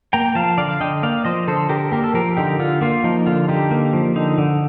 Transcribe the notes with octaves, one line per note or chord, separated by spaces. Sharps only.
A#3 G5 A#5
F3 F5 A5
D3 D5 F5
F5
D3 D#5 G5
A#3 D5 F5
F3 C5 D#5
D3 A4 C5
D3 G4 A#4
A#3 G4 A#4
A4
F3 G4 A#4
D3 D#4 G4
D3 F4
A#3 F4
F3 D#4
D3 F4
D3 D#4 G4
A#3
F3
D3 D#4
D3